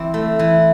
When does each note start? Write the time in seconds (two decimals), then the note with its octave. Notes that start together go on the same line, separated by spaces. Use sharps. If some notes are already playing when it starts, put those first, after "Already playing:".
Already playing: E3 C4
0.14 A3
0.39 E3